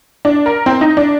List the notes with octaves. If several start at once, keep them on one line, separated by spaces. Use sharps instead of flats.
D4
A#4
C4
D#4
D4